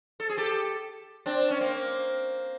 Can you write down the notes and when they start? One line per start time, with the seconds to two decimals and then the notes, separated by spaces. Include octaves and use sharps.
0.20 A4
0.29 G#4
0.37 G4 A4
1.26 C4 D4
1.50 C#4
1.61 A#3 C4